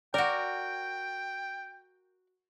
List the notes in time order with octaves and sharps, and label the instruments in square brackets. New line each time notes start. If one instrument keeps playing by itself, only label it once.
[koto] F#4 A#4 [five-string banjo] D5 [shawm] G5